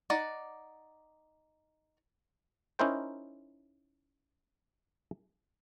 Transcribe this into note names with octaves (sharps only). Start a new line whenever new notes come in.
D#4 D5 F#5
C#4 D#4 E4 A#4 C5 G5